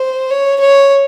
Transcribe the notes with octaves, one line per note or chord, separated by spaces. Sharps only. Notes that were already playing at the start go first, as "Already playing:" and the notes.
Already playing: C5
C#5
C#5